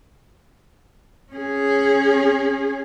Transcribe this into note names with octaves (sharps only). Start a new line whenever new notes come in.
C#4 G#4